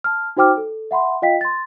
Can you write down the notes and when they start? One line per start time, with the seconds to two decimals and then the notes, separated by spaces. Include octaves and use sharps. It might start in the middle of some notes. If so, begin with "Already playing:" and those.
0.04 A5 F6
0.37 D#4 F#4 C5 G5 D6 F6
0.57 A4
0.91 E5 F#5 B5 C6
1.22 F4 D#5 F5 G5 B6
1.41 C6 A6